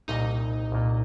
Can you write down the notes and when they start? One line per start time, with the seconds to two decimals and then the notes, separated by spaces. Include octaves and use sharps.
0.08 C2 A#2 D#4 D#5
0.72 C2 A#2